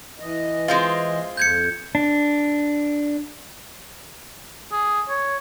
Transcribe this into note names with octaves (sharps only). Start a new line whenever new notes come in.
E3 D#5
G#3 C4 F4
F2 G6 G#6 C#7
D4
G#4
C#5